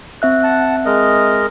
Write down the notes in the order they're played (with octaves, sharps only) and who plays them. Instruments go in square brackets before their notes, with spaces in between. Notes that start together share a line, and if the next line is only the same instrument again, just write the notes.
[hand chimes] C4 E5 F#6
[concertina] F#5 A5
G#3 A#4 D#5